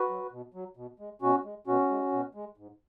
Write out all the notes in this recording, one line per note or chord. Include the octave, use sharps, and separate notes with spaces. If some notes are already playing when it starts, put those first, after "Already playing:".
Already playing: F#4 B4
F#3
B2
F#3
B2
G#3
B2 C#4 F#4
G#3
B2 C#4 F#4
G#3
B2
G#3
G#2